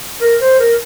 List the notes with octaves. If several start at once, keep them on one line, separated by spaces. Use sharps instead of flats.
A#4
C5
A#4